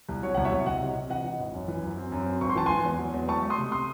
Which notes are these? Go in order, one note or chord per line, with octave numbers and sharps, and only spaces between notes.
C2
F#3 C#5
C2 F#5
C#5 E5
C2
C2 D#5 F#5
C3
C3
E3 D#5 F#5
E3
G#1
F#2
E3
F#2
C4
F#2
C4
G#1 C#6
C6
E3 A5
E3 G#5 C6
E2
F#3
E2
A3 A5 C#6
A3
C6 D#6
C3
C6 D#6